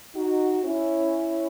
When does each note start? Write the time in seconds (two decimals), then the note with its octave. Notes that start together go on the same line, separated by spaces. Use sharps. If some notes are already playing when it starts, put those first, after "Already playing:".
0.16 D#4 F#4
0.65 C#4 E4